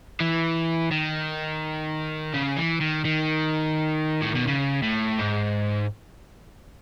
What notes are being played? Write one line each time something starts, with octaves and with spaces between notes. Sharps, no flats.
E3
D#3
C#3
E3
D#3
D#3
A2
B2
C#3
A2
G#2